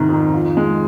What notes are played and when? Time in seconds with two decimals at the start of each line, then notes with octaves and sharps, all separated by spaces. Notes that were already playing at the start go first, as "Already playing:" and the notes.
Already playing: G#2 C3 D#3
0.09 F2
0.33 F3
0.57 G#3